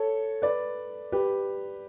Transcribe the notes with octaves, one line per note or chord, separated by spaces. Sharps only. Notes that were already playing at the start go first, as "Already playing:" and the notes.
Already playing: A4 C#5
B4 D5
G4 B4